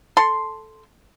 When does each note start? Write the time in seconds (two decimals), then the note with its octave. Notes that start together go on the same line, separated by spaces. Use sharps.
0.17 A4 C6